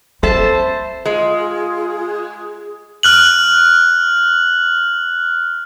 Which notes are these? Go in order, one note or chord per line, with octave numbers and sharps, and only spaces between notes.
C4 A4 C5 E5 A5
G#3 F4 G#4
F6 F#6 F#7